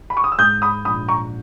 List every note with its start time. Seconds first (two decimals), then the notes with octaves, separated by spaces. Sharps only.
0.10 B5
0.17 C#6
0.24 D#6
0.32 E6
0.38 G#2 D#6 G6
0.62 B5 D#6
0.85 A#1 B5 D#6
1.08 A#5 C#6